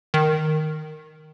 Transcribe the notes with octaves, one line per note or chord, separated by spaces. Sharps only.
D#3